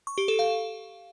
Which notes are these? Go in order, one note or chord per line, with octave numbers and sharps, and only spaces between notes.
C#6
G4
A4
F5